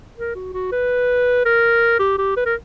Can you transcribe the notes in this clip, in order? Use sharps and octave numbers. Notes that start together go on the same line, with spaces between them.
A#4
F#4
F#4
B4
A#4
G4
G4
B4
A#4